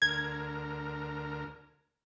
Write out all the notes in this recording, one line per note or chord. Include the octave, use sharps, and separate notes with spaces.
D2 A#4 G#6